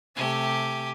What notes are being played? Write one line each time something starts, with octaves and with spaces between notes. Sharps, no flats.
C3 A3 G4 G#5